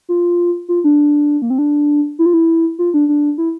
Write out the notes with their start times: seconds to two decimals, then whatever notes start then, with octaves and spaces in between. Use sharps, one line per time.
0.09 F4
0.69 F4
0.84 D4
1.42 A#3
1.50 C4
1.58 D4
2.19 E4
2.26 F4
2.34 E4
2.79 F4
2.94 D4
3.09 D4
3.38 E4